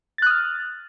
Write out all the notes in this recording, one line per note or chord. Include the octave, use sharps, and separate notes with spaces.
D#6 F6 F#6 A6